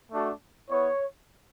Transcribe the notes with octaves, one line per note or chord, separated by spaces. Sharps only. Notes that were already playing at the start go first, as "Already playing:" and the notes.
A3 D4 F#4
B3 E4 C#5